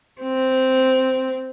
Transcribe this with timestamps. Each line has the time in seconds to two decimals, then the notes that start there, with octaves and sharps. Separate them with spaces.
0.22 C4